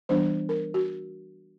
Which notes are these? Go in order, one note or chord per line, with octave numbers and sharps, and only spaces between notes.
E3 G3 B3 D4 C5
A#4
F#4